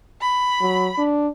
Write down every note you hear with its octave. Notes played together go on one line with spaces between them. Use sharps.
B5
F#3
D4